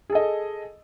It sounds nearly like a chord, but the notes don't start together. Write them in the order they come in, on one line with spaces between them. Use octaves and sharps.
G#4 A4 D#5